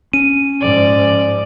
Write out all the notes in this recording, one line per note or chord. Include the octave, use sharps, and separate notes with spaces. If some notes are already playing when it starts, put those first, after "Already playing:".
C#4 D#7
G#2 F3 D5